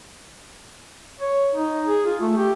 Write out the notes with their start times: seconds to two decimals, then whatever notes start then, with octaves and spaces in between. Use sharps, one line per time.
1.20 C#5
1.55 D#4
1.86 G#4
2.06 F4
2.21 A3
2.37 G4